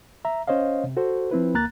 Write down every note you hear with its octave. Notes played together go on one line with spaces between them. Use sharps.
E5 A#5
C#4 C5 C#5 D#5 F5
C3
F#4 A4 C5
F3 C4 E4 B4
D2 A#3 A#5 F#6 A6